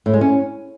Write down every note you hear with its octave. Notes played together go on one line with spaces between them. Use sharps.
A2
G#3
C#4